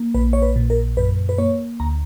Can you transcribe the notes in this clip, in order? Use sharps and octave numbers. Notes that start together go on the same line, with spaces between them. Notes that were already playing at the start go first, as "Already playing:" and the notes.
Already playing: A#3
A#1 B4
C#5
B4
A#2
A#4
F#2 B4
B4
A#3 C#5
D2 A#5